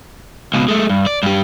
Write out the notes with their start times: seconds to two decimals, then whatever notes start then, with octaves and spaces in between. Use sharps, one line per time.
0.54 C#2 B2
0.68 G#3 A3
0.90 G2
1.06 D5
1.23 G2 G4